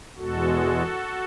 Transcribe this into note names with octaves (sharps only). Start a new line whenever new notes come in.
E2 B2 G#3 F#4 A4